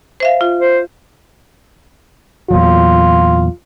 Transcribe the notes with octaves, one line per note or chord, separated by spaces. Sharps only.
C5 E5 F5
F4
C5
E2 A#2 F#3 F4